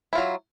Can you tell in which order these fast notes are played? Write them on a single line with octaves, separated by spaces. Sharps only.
E4 F4 F#3